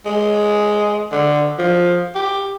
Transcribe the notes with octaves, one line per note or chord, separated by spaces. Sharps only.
G#3
D3
F3
G4